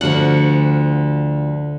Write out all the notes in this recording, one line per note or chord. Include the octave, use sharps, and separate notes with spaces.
D2 D3 F3 F#4 F#5